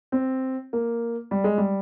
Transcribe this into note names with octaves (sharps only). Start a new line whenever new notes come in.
C4
A#3
G3
G#3
G3